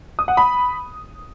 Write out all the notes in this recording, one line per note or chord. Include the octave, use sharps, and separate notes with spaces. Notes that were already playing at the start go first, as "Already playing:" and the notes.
D#6
F#5
B5